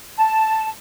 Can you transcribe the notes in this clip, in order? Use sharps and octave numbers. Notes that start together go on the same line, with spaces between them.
A5